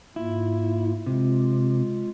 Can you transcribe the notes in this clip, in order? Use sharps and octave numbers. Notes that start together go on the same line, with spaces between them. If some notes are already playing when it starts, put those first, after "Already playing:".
G#2 A#3 E4 F4
C3 G#3 F4